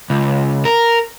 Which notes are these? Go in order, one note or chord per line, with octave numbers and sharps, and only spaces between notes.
C#2
A#4